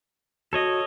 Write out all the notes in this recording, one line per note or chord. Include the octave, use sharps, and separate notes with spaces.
F#4 A4 C#5 D#5